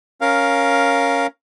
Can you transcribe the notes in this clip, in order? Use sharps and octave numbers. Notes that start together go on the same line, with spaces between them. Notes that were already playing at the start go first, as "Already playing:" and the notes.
C#4 A#4 F5